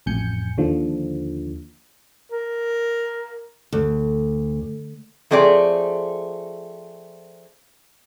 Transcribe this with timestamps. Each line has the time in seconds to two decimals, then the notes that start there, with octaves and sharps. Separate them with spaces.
0.06 A1 F2 G#5 G6 C#7
0.58 D#2 D3 F3
2.32 A#4
3.72 D2
5.31 F3 A3 C4 G#4 D5